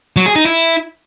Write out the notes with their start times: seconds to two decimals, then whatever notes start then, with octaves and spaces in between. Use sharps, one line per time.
0.16 F#3
0.26 G#4
0.36 D#4
0.45 E4